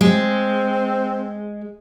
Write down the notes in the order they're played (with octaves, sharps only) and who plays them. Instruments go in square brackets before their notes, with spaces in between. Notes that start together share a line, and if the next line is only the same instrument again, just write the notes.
[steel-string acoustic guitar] G#3 [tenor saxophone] C4